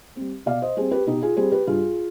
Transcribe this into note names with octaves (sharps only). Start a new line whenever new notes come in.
G3 C4
B2 D5 F5
C5 D#5
G3 C4 G#4 C5
G4 B4
B2 D#4 G4
F4 G#4
G3 C4 G#4 C5
G4 B4
G2 F4 G#4